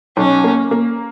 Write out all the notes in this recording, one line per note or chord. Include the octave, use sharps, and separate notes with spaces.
B1 C#4
A#3
A#3